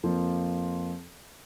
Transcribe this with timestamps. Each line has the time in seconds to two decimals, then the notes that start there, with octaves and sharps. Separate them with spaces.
0.03 F2 F3 A#3 F4